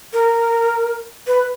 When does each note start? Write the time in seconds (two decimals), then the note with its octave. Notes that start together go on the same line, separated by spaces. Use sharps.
0.13 A#4
1.27 B4